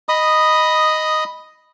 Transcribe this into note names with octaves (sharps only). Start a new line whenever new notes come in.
D#5 B5 D#6